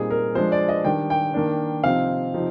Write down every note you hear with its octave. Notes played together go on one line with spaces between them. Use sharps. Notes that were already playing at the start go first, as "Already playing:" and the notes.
Already playing: A#2 G3 C4 D#4 G#4
A#4
F3 G#3 D4 C5
D5
D#5
D#3 G3 D4 G5
G5
D#3 A#3 D4
C3 F3 C4 D#4 F5
C3 F3 C4 D#4